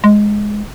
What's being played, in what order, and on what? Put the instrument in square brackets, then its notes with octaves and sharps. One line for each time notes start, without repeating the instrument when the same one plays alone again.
[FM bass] G#3